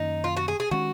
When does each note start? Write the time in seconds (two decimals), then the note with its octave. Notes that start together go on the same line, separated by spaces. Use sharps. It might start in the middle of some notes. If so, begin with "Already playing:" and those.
Already playing: F#2 D#3 A#3 C#4 D#4
0.24 F4
0.37 F#4
0.48 G#4
0.60 G#4
0.71 D#3 G#3 C#4 F#4